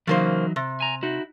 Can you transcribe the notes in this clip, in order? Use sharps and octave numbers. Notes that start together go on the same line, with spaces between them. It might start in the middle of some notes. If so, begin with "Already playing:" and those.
C#3 E3 F#3 A#3 D#4 C5
C3
G#5 A#5
D#4 E4 F#4